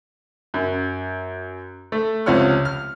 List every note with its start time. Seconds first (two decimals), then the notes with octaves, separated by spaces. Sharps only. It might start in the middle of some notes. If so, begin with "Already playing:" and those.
0.54 F#2
1.92 A3
2.26 C#2 C3 F3 C#5 F#5 F6
2.65 F6